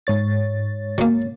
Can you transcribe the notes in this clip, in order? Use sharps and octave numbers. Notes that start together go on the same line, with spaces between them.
G#2 C#5 A6
F#3 A#3